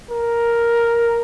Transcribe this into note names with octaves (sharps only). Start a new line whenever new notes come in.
A#4